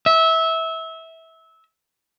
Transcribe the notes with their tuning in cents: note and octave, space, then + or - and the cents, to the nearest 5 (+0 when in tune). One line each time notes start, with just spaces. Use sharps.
E5 -20